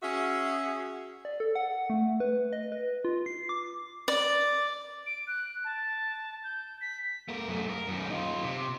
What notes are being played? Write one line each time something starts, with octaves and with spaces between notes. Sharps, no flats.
C#4 F#4 G#4 E5
D5
A4
F#5
A3
B4
D#5
B4
F4
C7
D6
D5
D7
F#6
A5
G6
B6
A3 A#4
F#2 A3
A#4
F#2 D#3
D#4 F4
C3